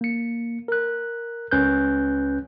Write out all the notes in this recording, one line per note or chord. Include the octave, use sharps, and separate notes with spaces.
A#3 C#7
A#4 F#6
C#2 C#4 B4 F#6 G6